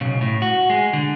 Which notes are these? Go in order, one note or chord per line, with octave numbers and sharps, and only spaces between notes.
B1 C#3
A2
F#4
G#3
D3